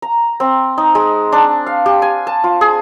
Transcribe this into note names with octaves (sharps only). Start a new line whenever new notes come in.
A#5
C4
D#4
G#3
D4
F5
G4
G#5
A5
F4
G#4